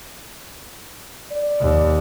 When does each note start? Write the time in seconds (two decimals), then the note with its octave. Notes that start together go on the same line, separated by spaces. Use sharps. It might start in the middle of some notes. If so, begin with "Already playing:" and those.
1.32 D5
1.60 D#2